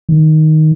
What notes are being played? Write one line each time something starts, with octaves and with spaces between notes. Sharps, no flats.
D#3